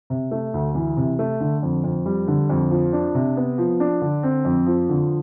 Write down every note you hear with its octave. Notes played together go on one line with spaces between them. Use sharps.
C3
A3
D2
E3
C3
A3
D3
F2
F2
G3
D3
F2
F3
D4
C3
B3
F3
D4
D3
C4
F2
F3
D3